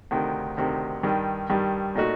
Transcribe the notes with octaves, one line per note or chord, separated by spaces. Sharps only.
D2 C3 D#3
D2 C3 D#3
G2 D#3 G3
G2 D#3 G3
A#2 A3 D#4 F#4